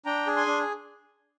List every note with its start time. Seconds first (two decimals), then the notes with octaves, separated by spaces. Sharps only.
0.06 D4 G5 A#5
0.27 G#4
0.36 G#5 C6
0.46 D4